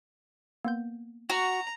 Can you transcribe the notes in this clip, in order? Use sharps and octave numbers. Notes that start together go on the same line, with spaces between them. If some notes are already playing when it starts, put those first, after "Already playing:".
A#3 B3 G6
F#4 A#5